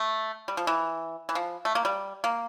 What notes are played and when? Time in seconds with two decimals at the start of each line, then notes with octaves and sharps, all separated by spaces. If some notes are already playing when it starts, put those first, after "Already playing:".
Already playing: A3
0.48 G3
0.57 F3
0.67 E3
1.29 E3
1.35 F3
1.65 A3
1.75 A#3
1.85 G3
2.24 A#3